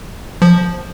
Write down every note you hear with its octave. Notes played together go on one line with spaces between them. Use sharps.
F3